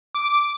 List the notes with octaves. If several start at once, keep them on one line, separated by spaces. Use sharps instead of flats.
D6